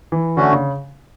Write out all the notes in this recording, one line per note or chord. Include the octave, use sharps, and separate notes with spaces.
E3
D3 A3 C#4 F#4
C#3